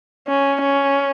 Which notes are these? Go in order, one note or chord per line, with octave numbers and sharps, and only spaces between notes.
C#4
C#4